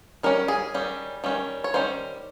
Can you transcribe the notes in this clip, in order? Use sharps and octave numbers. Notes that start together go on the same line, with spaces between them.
D#3 G3 C#4 A#4
G#4
D#3 G3 C#4
D#3 G3 C#4
C#5
D#3 G3 C#4 C5